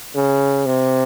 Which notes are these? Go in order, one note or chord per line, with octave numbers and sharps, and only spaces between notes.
C#3
C3